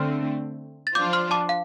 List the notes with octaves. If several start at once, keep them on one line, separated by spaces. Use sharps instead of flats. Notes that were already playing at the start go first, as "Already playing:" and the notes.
Already playing: D3 A3 C4 C6 F6
A6
F3 D4 F4 C5 D6 G6
C6 F6
A5 D6
F5